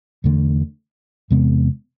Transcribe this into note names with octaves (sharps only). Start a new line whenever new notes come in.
E2 D3 A3
E2 C3 G#3 B3